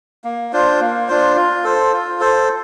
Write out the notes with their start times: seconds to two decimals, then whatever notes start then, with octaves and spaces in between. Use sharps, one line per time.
0.24 A#3
0.53 D4 F4 C5
0.81 A#3
1.08 D4 F4 C5
1.36 F4
1.64 A4 C5
1.93 F4
2.20 A4 C5